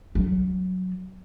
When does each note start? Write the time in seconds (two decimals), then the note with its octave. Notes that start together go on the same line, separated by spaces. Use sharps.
0.15 F#3